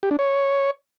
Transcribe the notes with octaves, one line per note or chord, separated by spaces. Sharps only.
G4
D4
C#5